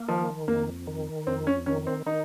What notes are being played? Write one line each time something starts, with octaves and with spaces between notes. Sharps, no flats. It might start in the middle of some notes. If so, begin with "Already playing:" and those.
Already playing: A#3
D#3 F3
F2 A#3
D#3
F2 C4
C#4
D#3 C#4
C4
D#3 D#4